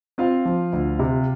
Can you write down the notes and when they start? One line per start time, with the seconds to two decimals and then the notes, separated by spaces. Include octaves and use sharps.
0.18 C4 F4 F5
0.45 F3
0.73 D2
0.99 C3